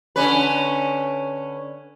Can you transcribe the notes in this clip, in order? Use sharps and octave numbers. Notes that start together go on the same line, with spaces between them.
D3 C#4 B4